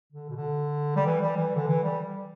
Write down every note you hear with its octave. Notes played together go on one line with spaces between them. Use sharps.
D3
B2
D3
G3
E3
G3
E3
D3
E3
G3